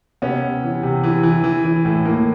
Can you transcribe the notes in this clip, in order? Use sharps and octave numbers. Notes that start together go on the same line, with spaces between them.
C3 B3 C#4
C3
E3
C3
E3
E3
E3
E3
A2
E3 A#3